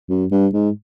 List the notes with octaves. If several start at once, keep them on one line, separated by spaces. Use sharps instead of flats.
F#2
G2
G#2